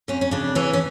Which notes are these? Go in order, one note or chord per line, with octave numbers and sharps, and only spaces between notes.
F2 C#4
C#4
C#3 D4
E3 C#4
C#4